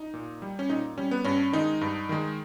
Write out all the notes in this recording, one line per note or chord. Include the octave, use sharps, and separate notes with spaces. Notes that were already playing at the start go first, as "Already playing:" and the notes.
Already playing: D#4
A#2
G3
C#4
A#2 D#4
G3 C#4
B3
G2 C#4
D#3 G#3 D#4
G2
D#3 G#3